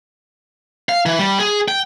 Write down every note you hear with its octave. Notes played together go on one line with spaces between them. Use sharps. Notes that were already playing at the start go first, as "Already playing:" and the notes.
F5
E3
G3
G#4
G5